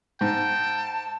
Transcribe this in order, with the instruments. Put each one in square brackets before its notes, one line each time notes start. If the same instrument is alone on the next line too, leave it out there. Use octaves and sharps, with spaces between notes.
[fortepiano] G#2 [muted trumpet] G5 [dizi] A5